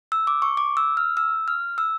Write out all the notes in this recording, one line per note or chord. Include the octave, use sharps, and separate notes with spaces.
E6
D6
C#6
D6
E6
F6
E6
F6
E6